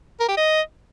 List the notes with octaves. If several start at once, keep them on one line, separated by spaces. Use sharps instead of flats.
A#4
G4
D#5